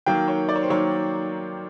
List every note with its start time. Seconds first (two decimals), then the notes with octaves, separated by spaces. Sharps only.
0.06 D#3 F#3 A#3 G5
0.28 C#5
0.49 D5
0.56 C#5
0.63 C5
0.70 D#3 F#3 A#3 C#5